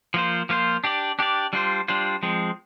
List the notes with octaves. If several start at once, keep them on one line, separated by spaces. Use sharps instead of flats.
F3 A#3 F4 C5
F3 A#3 F4 C5
D4 G4 D5
D4 G4 D5
G3 D4 F4 C5
G3 D4 F4 C5
F3 G#3 C4